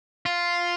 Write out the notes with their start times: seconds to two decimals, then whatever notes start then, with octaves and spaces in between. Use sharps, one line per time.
0.26 F4